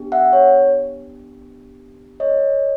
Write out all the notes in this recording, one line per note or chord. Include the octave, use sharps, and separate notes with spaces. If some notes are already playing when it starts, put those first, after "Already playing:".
Already playing: B3 D4 G4
E5 F#5
C#5
C#5 D#5